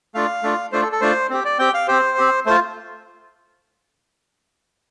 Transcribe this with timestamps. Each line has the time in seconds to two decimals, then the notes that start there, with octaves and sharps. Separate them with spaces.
0.14 A3 D4 F4 F5
0.43 A3 D4 F4
0.72 A3 D4 F4 C5
0.82 A4
0.92 A4
1.01 A3 D4 F4 C5
1.30 C4 G4
1.45 D5
1.59 C4 G4 G5
1.74 F5
1.88 C4 G4 C5
2.18 C4 G4
2.46 A3 F4 C5